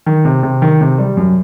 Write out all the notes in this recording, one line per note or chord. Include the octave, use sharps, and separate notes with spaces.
D#3
C3
C3
D#3
C3
G3
F#2